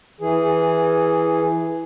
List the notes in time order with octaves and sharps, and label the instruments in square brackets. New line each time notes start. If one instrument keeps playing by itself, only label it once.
[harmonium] E3 G#4